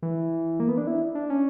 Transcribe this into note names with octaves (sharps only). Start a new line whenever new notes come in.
E3
A#3
B3
D4
E4
D4
C#4